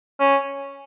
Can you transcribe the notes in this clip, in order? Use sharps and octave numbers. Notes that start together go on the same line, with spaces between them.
C#4